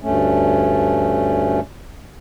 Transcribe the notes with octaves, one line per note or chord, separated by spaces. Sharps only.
D2 G2 A3 C#4